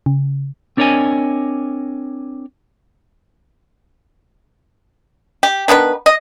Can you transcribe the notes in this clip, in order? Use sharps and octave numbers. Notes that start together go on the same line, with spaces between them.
C#3
C4 D4 A#4 C#5 D#5 G#5
G4
D#3 B3 D4 B4
D#5